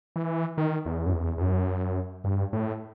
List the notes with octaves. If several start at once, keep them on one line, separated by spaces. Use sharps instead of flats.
E3
D#3
E2
F#2
E2
E2
F#2
G2
A2